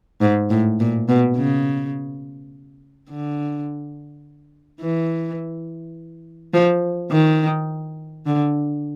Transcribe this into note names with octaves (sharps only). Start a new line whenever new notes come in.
G#2
A2
A#2
B2
C#3
D3
E3
F3
D#3
D3